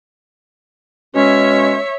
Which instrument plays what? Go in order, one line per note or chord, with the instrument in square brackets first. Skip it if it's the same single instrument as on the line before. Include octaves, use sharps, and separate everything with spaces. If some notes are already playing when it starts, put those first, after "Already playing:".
[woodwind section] B2 G#3 C#4 [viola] C#5 E5